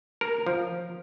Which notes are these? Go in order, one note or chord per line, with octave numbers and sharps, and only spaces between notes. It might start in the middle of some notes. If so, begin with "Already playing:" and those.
A#4
F3